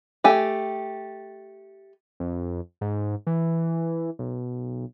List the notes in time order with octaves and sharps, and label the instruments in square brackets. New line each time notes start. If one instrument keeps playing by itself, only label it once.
[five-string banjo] A3 G4 G#5
[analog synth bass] F2
G#2
E3
B1